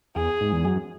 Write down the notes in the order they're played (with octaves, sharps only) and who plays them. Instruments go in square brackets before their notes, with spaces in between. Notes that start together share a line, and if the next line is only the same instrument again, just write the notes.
[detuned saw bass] E2 [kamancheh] G#4
[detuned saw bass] G#2
E2
F#2